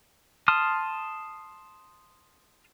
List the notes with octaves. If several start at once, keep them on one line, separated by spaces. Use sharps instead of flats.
A5 C6 D#6 F6